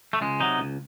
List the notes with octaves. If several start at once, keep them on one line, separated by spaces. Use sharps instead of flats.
A3
C#2 G#3
C3 F#3 D#4
C#2